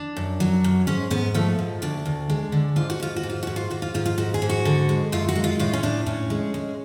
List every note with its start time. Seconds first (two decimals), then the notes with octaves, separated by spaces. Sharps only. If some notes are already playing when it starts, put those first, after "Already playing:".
Already playing: D4
0.16 F#2
0.40 F#3
0.64 F#2
0.87 G#2 C#4
1.10 G#2 B3
1.34 F3 A3
1.59 G#2
1.82 D2 D4
2.05 D2
2.30 G#3
2.52 D3
2.76 G#2 F4
2.90 F#4
3.00 G#2 F4
3.16 F#4
3.23 G#2
3.30 F4
3.43 G#2 F#4
3.56 F4
3.71 G#2 F#4
3.82 F4
3.94 G#2 F4
4.06 F4
4.18 G#2 F#4
4.34 G#4
4.42 G#2
4.49 F#4
4.65 D3
4.89 G#3
5.12 F#2 F4
5.29 F#4
5.35 G#3
5.44 F4
5.59 A2 F4
5.73 C#4
5.83 A2 D4
6.06 A2 C#4
6.30 G#3
6.54 G#3